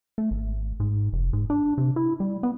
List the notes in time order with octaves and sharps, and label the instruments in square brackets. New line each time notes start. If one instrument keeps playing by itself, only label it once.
[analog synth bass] A3
G#1
G#2
F1
G#2
D4
C3
E4
G3
B3